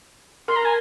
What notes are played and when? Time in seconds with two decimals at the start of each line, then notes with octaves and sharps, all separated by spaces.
0.48 A#4 C6
0.56 A#5
0.65 G#5